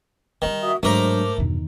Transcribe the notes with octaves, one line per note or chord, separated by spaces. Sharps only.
D#3 G3 G#3
F#4 E5 D#6
G#2 F#3 G#3 A3 D4 A#4 C5 D6
E2 G2 B2 D#3